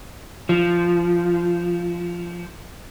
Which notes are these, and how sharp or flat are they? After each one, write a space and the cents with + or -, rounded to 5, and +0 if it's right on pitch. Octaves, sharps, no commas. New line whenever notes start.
F3 -10